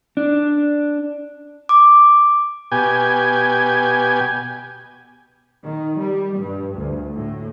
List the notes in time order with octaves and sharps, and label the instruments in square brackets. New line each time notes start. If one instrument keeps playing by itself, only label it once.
[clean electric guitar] D4
[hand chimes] D6
[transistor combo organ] B2 G4 G#5
[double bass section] D#3
G3
G2
D2
A2